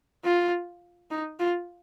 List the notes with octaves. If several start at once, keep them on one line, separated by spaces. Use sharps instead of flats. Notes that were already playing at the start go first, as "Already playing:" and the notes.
F4
D#4
F4